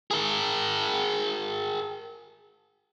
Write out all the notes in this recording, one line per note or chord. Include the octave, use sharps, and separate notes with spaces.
G#4 A#4